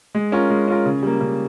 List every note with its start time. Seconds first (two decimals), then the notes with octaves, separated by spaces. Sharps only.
0.15 G#3
0.32 C#4 F4 A#4
0.50 G#3
0.68 C#4 F4 A#4
0.86 C#3
1.03 G3 A#3
1.21 C#3